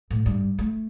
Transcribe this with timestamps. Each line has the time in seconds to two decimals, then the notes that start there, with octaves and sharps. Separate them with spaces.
0.11 A2
0.26 G2
0.59 A3